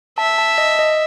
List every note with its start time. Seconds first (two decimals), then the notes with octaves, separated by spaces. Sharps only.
0.18 E5 A5
0.38 A5
0.58 D#5
0.79 D#5